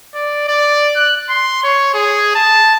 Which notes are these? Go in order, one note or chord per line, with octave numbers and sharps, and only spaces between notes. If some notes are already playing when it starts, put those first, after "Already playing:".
D5
D5
F#6
C6
C#5
G#4
A5